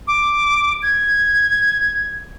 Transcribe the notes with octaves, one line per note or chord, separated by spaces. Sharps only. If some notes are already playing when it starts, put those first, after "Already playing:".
D6
G#6